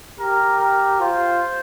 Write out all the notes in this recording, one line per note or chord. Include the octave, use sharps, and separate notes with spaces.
G4 A#4
A#4
F4 C5